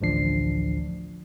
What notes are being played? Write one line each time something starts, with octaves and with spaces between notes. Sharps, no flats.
A1 D2 F3 D4 C7